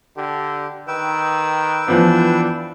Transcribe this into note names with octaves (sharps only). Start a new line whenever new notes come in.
D3 G4
D#3 B4 G5 E6
E3 F3 B3 D4